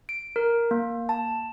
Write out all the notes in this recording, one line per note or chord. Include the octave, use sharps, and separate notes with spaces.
D7
A#4
A#3
A5